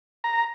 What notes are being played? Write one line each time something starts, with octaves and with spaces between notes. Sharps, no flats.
A#5